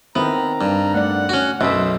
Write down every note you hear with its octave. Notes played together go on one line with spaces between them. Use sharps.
D#3 B3 C4 E4 A#5
G2
A3 D5 F#5
C#4 F#4
B1 F#2 B2 C5 E5